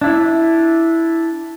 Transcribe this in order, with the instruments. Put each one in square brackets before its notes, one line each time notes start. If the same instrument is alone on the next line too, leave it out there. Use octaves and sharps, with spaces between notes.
[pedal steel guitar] D4 E4